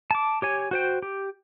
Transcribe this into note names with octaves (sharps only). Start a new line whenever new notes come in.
A5 D6
G4 C#5 G#5
F#4 C5 G5
G4